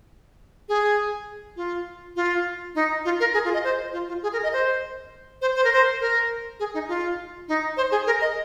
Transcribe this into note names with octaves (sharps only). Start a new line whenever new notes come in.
G#4
F4
F4
D#4
F4
A#4
G#4
F4
D#5
C5
F4
F4
G#4
A#4
D#5
C5
C5
C5
A#4
C5
A#4
G#4
D#4
F4
D#4
C5
G#4
A#4
D#5